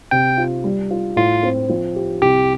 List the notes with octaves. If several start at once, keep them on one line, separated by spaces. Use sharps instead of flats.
C3 G5
F4
G3
F4
A2 F4
C4
F3
G4
C2 G4